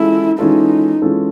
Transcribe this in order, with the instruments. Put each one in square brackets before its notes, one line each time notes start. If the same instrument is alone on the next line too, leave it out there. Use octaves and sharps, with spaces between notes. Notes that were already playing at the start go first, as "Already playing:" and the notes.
Already playing: [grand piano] E3 G#3 C#4 F4 A4 [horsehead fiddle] E4
[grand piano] E3 G#3 C#4 F4 A4 [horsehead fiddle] D#4
[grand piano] E3 G#3 C#4 F4 A4